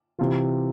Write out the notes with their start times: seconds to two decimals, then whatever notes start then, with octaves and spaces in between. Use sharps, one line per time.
0.19 C3 E3 F4